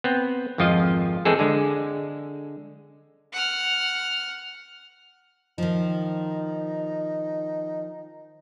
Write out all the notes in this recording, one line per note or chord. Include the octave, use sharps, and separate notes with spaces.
B3 C4
G#1 F2 F3 F4 D#5
E3 G#3 C4 G#4 A4
D3 G#3
F#5 F6
D#3 F3 D#4